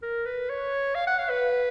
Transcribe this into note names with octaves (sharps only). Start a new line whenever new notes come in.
A#4
B4
C#5
F5
F#5
F5
B4